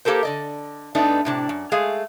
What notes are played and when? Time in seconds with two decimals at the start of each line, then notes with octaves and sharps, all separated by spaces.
0.05 A#3 G4 A4 A#4 C5
0.23 D3 D5 D#5
0.95 G2 A3 B3 D4 D#4
1.25 A2 C3 D4
1.49 F#2
1.72 G#3 A3 G#4 F5